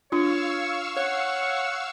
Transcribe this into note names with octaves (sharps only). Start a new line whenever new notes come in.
D4 F4 C#5 F5 C#6 E6
C#5 F#5